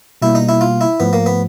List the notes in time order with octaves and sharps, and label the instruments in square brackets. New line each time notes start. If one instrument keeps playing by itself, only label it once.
[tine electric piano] B2 G3 A#3 [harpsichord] E4
[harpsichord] D#4
E4
F4
E4
[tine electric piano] G#2 F3 A3 [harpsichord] B3
[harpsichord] A#3
B3